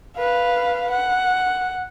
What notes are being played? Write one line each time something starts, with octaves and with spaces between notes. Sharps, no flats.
B4 F5
F#5